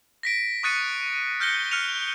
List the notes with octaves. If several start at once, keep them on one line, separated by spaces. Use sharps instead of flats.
A#6 B6 D7
C#6 D#6 F#6 A6 C#7 D#7
F6 G6 A#6 C#7 G7
F6 F#6 C#7 D#7 F7